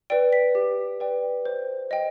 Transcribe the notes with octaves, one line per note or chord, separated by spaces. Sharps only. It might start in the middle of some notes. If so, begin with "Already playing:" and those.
B4 D5 G5 D7
B6
G4
B4 D5 G5
C5
D#5 G5